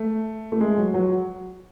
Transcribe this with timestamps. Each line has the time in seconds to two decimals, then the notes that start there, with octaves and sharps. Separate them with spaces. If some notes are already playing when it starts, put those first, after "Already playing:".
Already playing: A3
0.52 A3
0.60 G#3
0.77 F#3
0.94 F#3